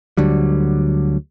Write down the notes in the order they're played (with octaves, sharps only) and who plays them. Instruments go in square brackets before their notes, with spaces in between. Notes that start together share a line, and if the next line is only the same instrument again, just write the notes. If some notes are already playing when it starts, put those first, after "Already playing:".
[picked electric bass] D2 D3 F#3 G3